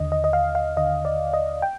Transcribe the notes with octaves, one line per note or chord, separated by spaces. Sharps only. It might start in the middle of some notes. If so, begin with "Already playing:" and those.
Already playing: D#2 D3 D#5
D#5
D#5
F5
F5
D#2 D3 D#5
D5
D#5
G5